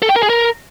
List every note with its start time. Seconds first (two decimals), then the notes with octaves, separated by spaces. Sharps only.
0.02 A4
0.09 G5
0.16 A#4
0.23 G#4
0.30 A#4